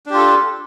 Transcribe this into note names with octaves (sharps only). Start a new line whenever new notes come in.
D4 F4 G4 A4